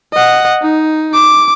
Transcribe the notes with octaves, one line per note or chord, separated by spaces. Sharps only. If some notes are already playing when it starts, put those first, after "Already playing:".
D#5 F#5
D#4
D6